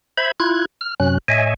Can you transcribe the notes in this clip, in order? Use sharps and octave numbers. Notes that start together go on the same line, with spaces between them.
C5 E5 B5 G#6
E4 F4 F#6 G#6
F6
F#2 C3 F#3 C#4 F#6
A2 C#5 D#5 E5 G#5